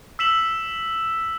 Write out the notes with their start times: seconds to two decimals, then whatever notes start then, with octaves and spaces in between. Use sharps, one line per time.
0.19 E6 B6 E7 F#7